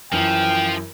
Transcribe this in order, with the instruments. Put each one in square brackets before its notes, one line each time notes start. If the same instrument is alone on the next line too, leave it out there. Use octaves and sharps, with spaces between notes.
[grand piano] F#2 E3 [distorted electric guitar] F3 [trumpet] G5